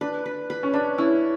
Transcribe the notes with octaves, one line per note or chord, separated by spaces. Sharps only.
D4 B4
B4
B4
C#4
D4 B4
C#4 E4